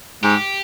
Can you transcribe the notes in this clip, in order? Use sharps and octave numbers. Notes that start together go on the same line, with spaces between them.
G#2 G4